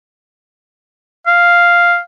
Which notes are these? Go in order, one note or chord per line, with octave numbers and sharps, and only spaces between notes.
F5